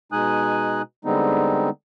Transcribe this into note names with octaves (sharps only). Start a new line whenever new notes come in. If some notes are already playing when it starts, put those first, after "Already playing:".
B2 G#3 D#4 G#5 D#6 F#6
D3 G3 G#3 B3 C4 D#4